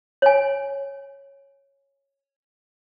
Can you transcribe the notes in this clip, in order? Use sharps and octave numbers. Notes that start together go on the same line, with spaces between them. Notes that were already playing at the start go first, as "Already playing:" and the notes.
C#5 G#5